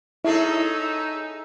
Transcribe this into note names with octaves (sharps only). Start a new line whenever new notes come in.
C#4 D#4 E4 G#4 A4 E5